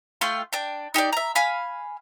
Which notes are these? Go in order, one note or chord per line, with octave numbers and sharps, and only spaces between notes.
A3 F4 G5 C6
D4 G5
D#4 G4 A4 D5
E5 A#5
F5 G#5 B5 F6